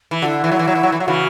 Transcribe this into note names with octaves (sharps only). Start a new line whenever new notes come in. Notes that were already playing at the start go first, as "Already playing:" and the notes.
E3
D3 E4 F#4
E3
F#3
E3
F#3
E3
F#3
E3
F#3
C#3 E3 F#4